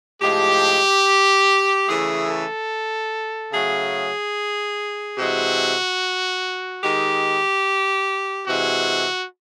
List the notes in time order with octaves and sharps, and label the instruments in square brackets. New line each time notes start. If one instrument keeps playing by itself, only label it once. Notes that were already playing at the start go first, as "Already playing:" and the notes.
[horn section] A2 F3 G#3 G4
C#3 E3 A3 G#4
A4
C#3 F#3 A3 G#4
C3 E3 G#3 F#4
D#3 G#3 G4
C3 E3 G#3 F#4